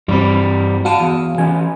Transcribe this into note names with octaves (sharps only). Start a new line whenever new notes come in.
G2 E3 G3 C4
F#4 F5 F#5 A5
E2
E3 C#4 G#5